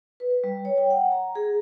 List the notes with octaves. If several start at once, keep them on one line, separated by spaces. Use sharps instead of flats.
B4
G3
C#5
G5
F#5
A#5
G#4